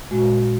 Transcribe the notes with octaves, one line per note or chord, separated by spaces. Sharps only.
A#2 G#3 F#4